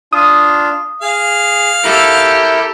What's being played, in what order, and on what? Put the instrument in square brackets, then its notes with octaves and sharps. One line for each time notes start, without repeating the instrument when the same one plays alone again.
[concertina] D4 F4 [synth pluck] D#6
[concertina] G#4 [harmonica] F5
[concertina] E4 A#4 [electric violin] G4 A4